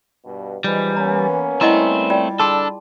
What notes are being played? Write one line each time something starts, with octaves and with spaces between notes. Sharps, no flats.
G2 B2
E3 F3 G3 G#3 D#4
A#3 B3 C#4 A#5
G3 A3 C4 E4 D#5 F#5
F4 D5 G5
D4 G#4 A4 A5 C6